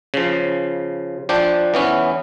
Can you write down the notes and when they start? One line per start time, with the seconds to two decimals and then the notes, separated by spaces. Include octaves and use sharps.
0.14 C#3 F3
1.29 F3 D4 G5
1.74 E3 B3 C#4